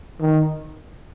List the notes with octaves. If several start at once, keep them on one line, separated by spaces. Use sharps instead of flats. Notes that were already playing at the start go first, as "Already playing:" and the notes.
D#3